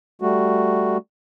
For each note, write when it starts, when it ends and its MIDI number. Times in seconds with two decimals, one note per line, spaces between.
0.22 0.97 55
0.22 0.97 57
0.22 0.97 66